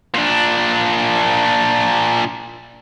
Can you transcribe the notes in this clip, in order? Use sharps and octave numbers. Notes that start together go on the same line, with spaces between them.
A#2 D4